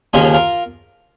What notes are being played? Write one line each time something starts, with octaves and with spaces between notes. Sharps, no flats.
D#2 C#3 F3 A#3 C#4 A#4 D#5
F4
F4 A#4